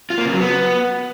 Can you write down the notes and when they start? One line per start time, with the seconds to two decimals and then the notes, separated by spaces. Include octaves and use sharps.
0.10 F4
0.18 A#3
0.25 C#3
0.33 F#3
0.40 B3